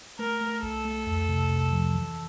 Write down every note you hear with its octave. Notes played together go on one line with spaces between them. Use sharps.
A3 A#4
A3
C2 A4
A3
F2
C3
C3
F3
E3